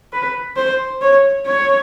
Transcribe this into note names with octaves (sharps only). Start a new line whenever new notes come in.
B4
C5
C#5
C#5